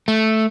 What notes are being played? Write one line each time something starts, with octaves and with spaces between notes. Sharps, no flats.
A3